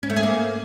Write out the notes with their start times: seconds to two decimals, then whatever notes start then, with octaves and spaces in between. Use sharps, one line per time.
0.03 C#4
0.10 A3
0.16 G#4
0.23 A#3